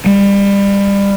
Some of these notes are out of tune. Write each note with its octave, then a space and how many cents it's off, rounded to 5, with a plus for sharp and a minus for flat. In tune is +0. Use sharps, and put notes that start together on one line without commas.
G3 +30